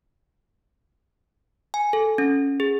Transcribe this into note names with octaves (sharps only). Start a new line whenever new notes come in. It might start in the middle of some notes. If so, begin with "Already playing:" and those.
G#5
A4
C#4
G#4